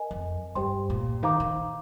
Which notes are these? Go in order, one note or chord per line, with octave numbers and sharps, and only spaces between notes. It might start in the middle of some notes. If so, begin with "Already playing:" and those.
Already playing: A#4 D#5 G#5
F2
G2 G4 C5 G5 C6
A#2
D#3 C5 F5 A#5 D6
D#3